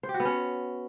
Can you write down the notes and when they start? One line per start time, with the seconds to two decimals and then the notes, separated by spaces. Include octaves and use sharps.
0.03 C5
0.09 G4
0.14 F#4
0.20 B3
0.25 C#4